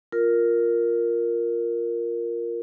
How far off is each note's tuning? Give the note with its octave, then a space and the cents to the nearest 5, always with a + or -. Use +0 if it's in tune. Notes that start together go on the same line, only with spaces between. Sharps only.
F4 +0 A#4 +0